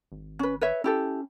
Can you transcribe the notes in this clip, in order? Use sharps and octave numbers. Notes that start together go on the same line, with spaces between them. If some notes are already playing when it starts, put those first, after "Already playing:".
G#1
C#4 B4
B4 C#5 E5
C#4 E4 G4 A4